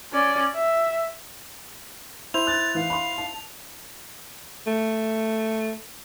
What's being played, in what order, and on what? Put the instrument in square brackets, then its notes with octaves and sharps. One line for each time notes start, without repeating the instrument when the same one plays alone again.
[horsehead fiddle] C#4 D5
E5
[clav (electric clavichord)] E4 C5 [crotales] F7
[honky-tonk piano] F#6 [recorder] A6
[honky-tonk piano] E3 [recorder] F5
[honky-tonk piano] B5 C6
A5
[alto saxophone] A3